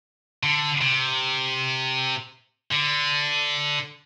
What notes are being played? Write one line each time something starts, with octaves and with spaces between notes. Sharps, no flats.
D3
C3
D3